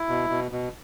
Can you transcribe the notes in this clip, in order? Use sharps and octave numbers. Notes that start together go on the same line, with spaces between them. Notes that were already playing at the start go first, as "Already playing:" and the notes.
Already playing: E4
B2
B2
B2